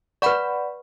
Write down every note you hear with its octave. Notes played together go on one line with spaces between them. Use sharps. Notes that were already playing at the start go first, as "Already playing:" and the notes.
B4 D5 F#5 B5 C#6